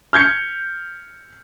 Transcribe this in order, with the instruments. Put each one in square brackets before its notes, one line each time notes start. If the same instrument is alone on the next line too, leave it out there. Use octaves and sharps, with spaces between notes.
[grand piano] F6 G6 G#6 C#7